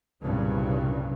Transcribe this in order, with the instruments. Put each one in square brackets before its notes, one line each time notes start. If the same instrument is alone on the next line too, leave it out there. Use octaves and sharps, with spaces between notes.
[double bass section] C2 G2 A#2 C#3 F#3